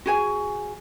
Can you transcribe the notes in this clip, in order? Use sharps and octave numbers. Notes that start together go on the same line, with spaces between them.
F#4 G#4 G#5